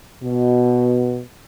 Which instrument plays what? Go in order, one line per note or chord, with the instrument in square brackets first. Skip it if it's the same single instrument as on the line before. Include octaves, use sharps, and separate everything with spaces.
[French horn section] B2